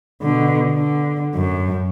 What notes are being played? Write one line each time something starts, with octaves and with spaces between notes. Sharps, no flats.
B2 D3
D3
F#2